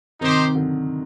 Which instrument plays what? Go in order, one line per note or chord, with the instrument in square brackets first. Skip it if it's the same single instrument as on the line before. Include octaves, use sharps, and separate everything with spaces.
[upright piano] C3 D#3 [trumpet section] D#4 G4 C5 G5
[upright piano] D3 F#3